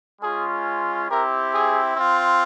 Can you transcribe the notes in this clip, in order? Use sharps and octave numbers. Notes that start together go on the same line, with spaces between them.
G#3 C#4 F4 G#4
C4 E4 G4 A#4
G#4
C4 F4